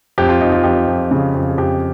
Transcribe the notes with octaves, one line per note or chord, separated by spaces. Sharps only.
F2 G4
F4
F2 D#4
F4
F2 G4
F2
C#3
F2
G#4
F2 G4